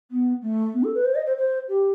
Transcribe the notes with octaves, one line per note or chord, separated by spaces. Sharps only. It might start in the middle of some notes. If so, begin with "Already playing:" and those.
B3
A3
B3
A4
B4
C5
D#5
C5
C5
G4